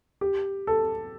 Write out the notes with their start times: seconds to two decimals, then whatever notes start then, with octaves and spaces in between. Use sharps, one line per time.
0.21 G4
0.67 A4